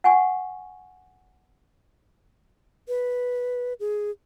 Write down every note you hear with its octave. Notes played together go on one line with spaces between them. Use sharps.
F#5 G#5 C#6
B4
G#4